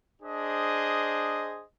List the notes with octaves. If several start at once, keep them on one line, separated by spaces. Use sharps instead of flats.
D4 G#4 C5 D#5